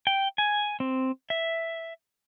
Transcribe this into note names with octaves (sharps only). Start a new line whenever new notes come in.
G5
G#5
C4
E5